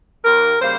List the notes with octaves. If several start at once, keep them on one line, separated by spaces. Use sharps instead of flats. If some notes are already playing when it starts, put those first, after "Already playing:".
D#2 A#4
C#3 G3 A#3 C5